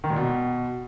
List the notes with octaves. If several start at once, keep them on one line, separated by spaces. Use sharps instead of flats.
D#3
A#2
B2